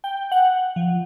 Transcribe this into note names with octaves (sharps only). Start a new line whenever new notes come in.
G5
F#5
F3